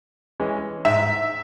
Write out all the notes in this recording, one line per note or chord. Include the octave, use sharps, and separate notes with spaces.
E3 G#3 C#4
G#2 E5